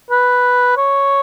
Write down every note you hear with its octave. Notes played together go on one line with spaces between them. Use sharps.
B4
C#5